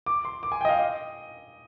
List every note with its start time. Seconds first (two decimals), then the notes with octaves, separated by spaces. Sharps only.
0.06 D6
0.25 C6
0.43 D6
0.52 G#5
0.61 G5
0.65 D#5
0.69 F5
0.79 D#5